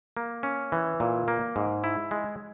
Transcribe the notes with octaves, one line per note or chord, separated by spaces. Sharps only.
A#3
C#4
E3
A#2
A#3
G#2
E4
G#3